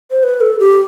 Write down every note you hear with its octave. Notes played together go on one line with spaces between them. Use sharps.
C5
B4
A4
G4